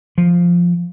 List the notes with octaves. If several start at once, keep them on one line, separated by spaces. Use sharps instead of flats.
F3